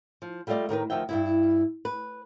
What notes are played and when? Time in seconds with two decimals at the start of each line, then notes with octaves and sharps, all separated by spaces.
0.22 F3
0.47 G3 A3 E4 F4 D5 D#5
0.69 A2 D#3 A#4 B4
0.90 D2 D#3 F3 D#4 E5 G5
1.09 G2 F3 E4
1.85 B4